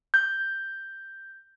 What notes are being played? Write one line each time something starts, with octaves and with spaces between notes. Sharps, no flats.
G6